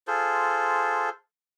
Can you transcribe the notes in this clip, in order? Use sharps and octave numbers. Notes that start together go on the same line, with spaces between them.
F4 G#4 A4 C5